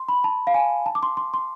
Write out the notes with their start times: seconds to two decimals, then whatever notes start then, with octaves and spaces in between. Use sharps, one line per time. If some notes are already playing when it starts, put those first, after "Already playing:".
Already playing: C6
0.08 B5
0.24 A5
0.47 F5
0.54 G#5
0.86 A5
0.95 D6
1.03 C6
1.17 C6
1.34 C6